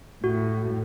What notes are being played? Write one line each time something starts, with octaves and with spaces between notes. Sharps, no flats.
A2 F#4